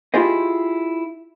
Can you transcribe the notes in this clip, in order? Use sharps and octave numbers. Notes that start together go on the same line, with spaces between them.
E4 F4 G4 G#4 C5 D#5